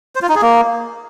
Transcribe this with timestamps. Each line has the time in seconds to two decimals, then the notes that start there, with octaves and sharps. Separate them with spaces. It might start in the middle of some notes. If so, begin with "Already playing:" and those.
0.15 C5
0.22 F4
0.29 D#4
0.35 G#4
0.42 A#3